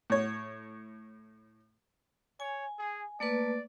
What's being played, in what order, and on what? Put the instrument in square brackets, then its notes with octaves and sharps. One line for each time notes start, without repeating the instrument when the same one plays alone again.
[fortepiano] A2 C#5
[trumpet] C#5 [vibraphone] G#5
[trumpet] G#4
[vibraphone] A3 A#3 B4 [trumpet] D5